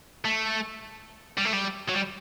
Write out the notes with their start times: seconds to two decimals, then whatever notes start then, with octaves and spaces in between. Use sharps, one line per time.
0.25 A3
1.37 G3
1.45 A3
1.53 G3
1.88 F#3
1.94 G3